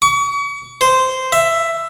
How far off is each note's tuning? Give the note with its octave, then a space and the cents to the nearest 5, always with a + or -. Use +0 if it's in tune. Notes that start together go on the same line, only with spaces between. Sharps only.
C#6 +40
C5 -10
E5 +10